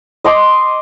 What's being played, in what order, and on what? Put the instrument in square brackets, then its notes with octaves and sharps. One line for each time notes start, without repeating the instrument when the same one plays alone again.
[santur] D#5 C6 D6